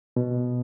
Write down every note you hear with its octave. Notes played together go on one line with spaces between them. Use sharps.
B2